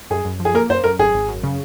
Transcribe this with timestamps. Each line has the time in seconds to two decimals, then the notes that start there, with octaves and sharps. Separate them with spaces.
0.10 F#2 G#4
0.25 F#2
0.40 F3
0.45 G#4
0.54 A#3 A#4
0.70 F#2 C5
0.84 F#2 A#4
0.99 G#1 G#4
1.14 G#1
1.28 F#2
1.44 C#3